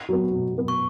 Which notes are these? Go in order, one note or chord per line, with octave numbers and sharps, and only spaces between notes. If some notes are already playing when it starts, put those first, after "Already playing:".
F#3 B3
B2
F#3 B3
C#6